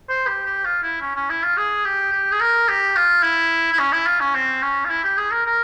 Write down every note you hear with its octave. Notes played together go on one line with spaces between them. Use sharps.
C5
G4
G4
F4
E4
C#4
C#4
E4
F4
G#4
G4
G4
G#4
A#4
G4
F4
E4
E4
C#4
E4
F4
C#4
C4
C#4
F4
E4
G4
G#4
A#4
A#4